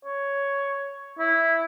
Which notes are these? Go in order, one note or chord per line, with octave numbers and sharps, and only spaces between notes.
C#5
E4